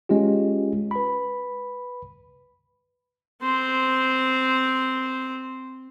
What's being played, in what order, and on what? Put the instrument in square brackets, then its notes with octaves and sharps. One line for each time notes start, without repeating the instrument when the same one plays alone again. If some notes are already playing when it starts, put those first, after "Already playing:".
[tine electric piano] G#3 C#4 F4 G4
B4 B5
[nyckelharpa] C4 C5